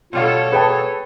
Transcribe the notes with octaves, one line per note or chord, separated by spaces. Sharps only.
B2 G3 F4 A4 C#5 F5
G#4 B4 G5 A5